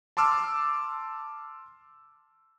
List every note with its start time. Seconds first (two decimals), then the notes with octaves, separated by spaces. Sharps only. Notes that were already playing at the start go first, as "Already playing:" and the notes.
0.17 A5 C6 D6 E6 F6